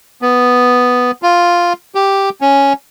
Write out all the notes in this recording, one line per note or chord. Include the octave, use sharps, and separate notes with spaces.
B3
F4
G4
C#4